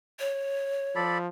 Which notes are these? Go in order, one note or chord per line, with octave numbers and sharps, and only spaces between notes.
C#5
F3 A4 D5 B5